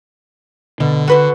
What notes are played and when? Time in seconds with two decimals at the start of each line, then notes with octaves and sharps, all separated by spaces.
0.80 B2 D3
1.08 F#4 B4 C5